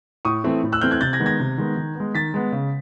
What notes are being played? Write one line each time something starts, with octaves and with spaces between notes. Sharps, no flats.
A2 C#6 D#6
E3 A3 C4
A2
E6 F#6
E3 A3 C4 F6 G6
F#6 G#6
C3 G6 A6
G#6 A#6
D#3 G#3 B3
G#6 A#6
C3
D#3 G#3 B3
D#3
G#3 B3
D#3 A6 B6
G#3 B3
C#3